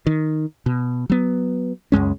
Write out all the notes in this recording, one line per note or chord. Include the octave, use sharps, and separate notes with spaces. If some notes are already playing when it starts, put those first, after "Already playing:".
D#3
B2
F#3 B3
C#2 F#2 G#3 C#4